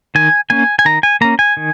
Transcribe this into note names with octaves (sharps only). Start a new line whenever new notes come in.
D#3 G#5
A#3 C#4 G#5
G#5
D#3 A#5
G#5
A#3 C#4 A#5
G#5
D#3